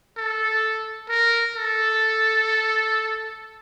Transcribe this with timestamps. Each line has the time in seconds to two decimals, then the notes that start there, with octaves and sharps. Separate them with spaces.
0.17 A4
1.09 A#4
1.55 A4